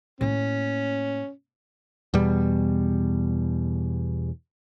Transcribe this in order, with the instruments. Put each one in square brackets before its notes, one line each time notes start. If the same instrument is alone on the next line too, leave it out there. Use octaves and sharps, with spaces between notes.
[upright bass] A2 A#3 [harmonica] C#4
[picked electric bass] E2 B2 G3